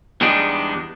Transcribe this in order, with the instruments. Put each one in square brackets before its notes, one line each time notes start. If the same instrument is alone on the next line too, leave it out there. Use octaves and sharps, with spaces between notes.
[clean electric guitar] E2 G3 G#3 B3 D4 D#4